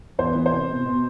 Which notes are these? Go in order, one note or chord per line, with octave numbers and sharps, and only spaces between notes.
E2 C5
E3 B4
C5
C3
B2
B2